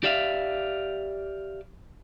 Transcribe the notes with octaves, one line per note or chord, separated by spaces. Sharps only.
G4 D5 E5 F5